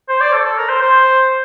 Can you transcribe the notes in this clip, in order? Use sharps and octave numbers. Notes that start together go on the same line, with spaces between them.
C5
D5
A4
A4
A#4
C5
C5